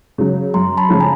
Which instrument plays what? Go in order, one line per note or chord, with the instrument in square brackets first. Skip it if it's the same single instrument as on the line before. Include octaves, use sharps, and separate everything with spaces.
[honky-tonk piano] C#3 F#3
[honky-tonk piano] F#2 [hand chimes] A#5 C6
[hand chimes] A5 B5
[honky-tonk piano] C#3 F3 A3
[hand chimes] G#5 A#5